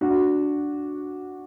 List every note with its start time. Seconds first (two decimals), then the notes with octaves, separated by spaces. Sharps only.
0.01 D4 F#4